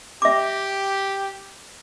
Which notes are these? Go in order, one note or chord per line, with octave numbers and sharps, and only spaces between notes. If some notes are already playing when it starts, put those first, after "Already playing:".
G4 E5 D6